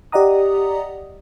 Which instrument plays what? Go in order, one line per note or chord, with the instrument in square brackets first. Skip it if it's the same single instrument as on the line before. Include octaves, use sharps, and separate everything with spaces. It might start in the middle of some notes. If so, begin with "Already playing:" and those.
[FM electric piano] G4 D5 D#5 F#5 A#5 D#6